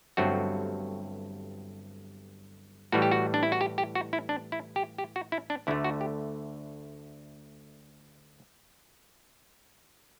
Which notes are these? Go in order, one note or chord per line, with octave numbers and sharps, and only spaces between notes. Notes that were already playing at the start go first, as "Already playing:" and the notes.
G1 G2 F#3 A3 C4 F#4
A2 E3 G3 F#4
G4
F#4
D4
E4
F#4
G4
G4
F#4
E4
D4
E4
G4
G4
F#4
E4
D4
D2 D3 A3 E4
F#4
G4